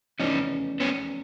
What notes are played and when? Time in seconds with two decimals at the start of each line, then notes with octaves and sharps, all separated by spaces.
0.20 F1 E2 C#3 C#4 D#4
0.80 B3 C#4